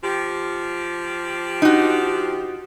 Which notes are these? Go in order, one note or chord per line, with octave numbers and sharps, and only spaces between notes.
F3 G4
D#4 F#4